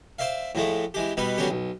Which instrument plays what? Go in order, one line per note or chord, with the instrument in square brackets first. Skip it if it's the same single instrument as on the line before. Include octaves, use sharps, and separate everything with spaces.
[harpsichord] C5 D5 E5 F5
A2 F3 G#3 A3
E3 G#3 G4
B2 G3 B3 D#4 B4
D3 F#3 G3 B3 C#4 G4
B1